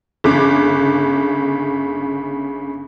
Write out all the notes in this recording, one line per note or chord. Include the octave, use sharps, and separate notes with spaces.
G1 C#3 D6